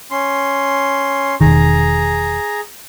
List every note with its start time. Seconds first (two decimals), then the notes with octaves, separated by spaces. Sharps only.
0.11 C#4 C6
1.41 E1 C2 D#3 G#4 A#5